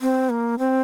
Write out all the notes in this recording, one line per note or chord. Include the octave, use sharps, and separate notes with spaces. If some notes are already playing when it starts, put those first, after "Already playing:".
C4
A#3
C4